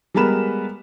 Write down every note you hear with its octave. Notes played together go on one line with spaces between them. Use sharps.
G3 G#3 B3 A#4 B5 E7